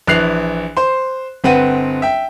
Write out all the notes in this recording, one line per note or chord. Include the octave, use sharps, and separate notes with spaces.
A#1 E3 F#6 C7 F7
C5 C6
G1 C4 B4 F#5 D#7
E5 G5